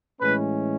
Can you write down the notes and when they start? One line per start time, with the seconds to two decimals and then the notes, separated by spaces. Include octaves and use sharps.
0.20 A2 E3 G#3 C#4 B4